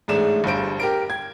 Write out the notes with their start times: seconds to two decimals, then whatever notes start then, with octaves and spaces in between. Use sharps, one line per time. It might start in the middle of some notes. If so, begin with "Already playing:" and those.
0.08 A1 G#2 G#3 A3 D4 E7
0.44 G1 G2 C5 D7
0.80 G4 A#4 D7
1.10 G#6